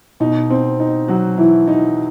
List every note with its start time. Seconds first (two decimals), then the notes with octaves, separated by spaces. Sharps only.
0.20 B2 D#4
0.50 C4
0.80 D#4
1.08 F#3 F#4
1.38 E3 E4
1.67 D#4